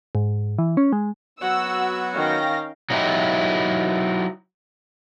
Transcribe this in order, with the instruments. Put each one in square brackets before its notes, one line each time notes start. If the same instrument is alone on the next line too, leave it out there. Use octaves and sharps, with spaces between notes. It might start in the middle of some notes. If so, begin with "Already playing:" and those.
[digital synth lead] G#2
E3
C#4
G#3
[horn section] F#3 B3 F#4 [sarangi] F#5 [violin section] E6
[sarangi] D#3 [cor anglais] C#4 [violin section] F5 G5 A#6
[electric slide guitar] F#3 D#4 E4 G4